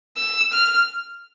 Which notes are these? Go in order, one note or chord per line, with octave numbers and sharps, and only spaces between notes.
E6
F6